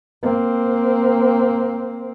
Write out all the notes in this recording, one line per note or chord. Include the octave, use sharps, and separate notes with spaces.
A#3 C4